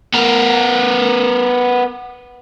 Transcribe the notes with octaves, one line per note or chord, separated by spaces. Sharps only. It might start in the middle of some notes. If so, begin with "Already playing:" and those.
B3 A#4